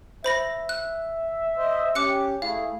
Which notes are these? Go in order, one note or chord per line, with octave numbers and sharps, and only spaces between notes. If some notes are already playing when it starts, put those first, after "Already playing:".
C5 E5 B5 A#6
F#6
C5 D#5
C#4 G4 D6 F#6 C#7
A3 E4 G#4 F5